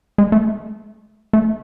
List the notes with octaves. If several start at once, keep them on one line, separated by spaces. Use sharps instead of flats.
G#3
A3
A3